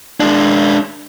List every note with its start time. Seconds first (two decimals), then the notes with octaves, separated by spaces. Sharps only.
0.20 G#3 D4